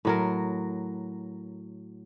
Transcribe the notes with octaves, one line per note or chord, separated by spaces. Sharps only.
A2 F#3 A#4